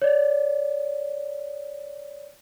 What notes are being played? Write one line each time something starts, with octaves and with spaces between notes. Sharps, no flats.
C#5 D5